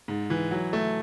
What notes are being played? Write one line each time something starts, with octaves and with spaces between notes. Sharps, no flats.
G#2
E3
F#3
A3